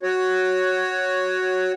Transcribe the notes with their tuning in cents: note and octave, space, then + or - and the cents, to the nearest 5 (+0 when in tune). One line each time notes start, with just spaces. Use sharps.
F#4 +0 C#5 +0